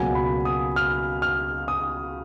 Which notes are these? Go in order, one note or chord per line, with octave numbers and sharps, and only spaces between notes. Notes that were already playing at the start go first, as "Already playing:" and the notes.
Already playing: C#2 B2 F#3 A#3 G#5
B5
D#6
F6
F6
D#6